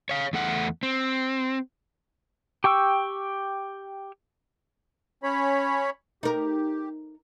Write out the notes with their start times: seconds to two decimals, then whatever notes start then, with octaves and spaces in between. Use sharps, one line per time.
0.09 C#5 F5
0.33 E2 A3 F#5
0.83 C4
2.64 G4 G5 C#6 E6
5.23 C#4 C#5 B5
6.23 D#4 G4 A#4